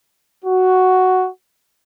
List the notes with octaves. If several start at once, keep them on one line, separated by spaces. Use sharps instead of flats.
F#4